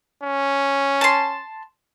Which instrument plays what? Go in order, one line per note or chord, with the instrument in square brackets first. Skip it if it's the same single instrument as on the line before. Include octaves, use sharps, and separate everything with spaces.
[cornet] C#4
[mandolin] A5 C6